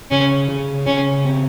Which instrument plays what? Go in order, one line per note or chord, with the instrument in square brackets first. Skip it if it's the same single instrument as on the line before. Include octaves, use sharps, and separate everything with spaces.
[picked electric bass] C#3 [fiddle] C#4
[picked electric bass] C#3
[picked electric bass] C#3 [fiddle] C#4
[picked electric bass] C4